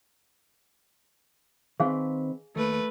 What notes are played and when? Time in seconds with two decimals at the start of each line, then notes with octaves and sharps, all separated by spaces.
1.80 D#3 C4 G#4 B4 F5 G#5
2.56 D#2 A3 B4